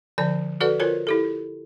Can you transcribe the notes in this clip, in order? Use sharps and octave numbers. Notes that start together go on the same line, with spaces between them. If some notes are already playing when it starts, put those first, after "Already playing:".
D3 F3 D5 G#5
F#4 A4 B4 D5 F#5
F4 A#4 C5 C#5
E4 G4 A4